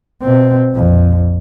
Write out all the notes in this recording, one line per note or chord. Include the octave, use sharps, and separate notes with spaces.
B2 C4
A#1 F2